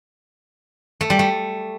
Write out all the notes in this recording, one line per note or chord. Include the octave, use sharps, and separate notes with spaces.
A3
G3
A3